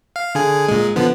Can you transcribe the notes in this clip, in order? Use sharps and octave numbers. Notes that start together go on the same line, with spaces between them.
F5
D3 G#4 G#5
A#2 G#3
D3 F3 B3